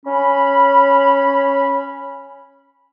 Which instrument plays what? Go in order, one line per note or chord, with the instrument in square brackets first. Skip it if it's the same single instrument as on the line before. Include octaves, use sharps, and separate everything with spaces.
[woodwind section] C#4 B5